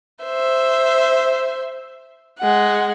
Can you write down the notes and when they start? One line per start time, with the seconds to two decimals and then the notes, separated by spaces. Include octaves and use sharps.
0.25 C5 E5
2.39 G#3 F#5